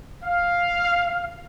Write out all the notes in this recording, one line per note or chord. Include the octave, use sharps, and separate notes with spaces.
F5